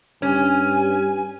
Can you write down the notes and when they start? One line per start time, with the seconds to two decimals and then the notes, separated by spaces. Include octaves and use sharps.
0.22 G2 C#4 G#5